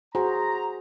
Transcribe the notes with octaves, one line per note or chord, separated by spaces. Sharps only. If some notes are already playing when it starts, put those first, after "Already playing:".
F#4 G#4 C5 A#5